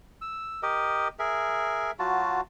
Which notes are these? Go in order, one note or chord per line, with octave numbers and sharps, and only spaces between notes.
E6
G4 A#4 D#5
G#4 A#4 E5
F#3 F4 F#4 A5